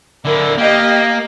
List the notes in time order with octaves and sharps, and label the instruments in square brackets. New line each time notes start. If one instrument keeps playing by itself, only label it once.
[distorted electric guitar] D3 E4 [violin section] A#4
[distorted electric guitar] A#3 [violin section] G4 D#5